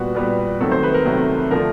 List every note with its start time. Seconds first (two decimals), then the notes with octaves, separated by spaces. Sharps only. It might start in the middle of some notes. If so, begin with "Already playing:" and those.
Already playing: A#2 G3 B3 F#4
0.15 A#2 G3 B3
0.60 C3 D#3 F#3 A3 A4
0.72 C5
0.83 B4
0.94 A#4
1.05 C3 D#3 F#3 A3
1.51 D3 F3 A3 A#4